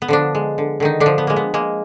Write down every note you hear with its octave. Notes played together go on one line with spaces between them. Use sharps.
B3
D3 F3 D4
G#3
D3
D3 D#3 D#4
D3 D4
F3
B3
G#3 A#3
B3
G#3 A#3